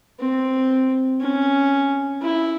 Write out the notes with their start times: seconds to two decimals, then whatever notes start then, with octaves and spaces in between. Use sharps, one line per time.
0.20 C4
1.21 C#4
2.22 E4